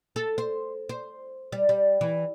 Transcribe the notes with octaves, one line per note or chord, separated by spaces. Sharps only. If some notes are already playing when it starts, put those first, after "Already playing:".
A4
C5
C5
G3
G3
E3